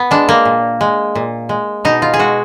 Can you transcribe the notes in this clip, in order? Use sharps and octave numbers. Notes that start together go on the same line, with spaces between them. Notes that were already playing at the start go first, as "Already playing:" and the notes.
Already playing: B3
G#3 D4
A#3
A#2
G#3
A#2
G#3
B2 D#4
F4
G#4
G#3 F#4